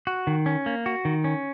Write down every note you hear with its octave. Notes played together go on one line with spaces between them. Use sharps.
F#4
D#3
C#4
A#3
F#4
D#3
C#4